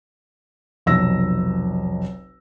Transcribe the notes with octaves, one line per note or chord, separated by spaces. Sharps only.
F1 B1 E6 A#6